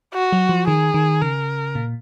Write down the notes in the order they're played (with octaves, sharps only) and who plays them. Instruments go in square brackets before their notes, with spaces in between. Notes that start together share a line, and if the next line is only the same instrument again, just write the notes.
[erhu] F#4
[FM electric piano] F#3
F3
[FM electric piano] D#3 [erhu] G#4
[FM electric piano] D#3
[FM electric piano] C#3 [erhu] A#4
[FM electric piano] A#2